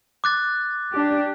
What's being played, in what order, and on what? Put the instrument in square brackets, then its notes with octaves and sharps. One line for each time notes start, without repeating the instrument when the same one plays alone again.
[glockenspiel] D6 F#6 A6
[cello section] D4 G4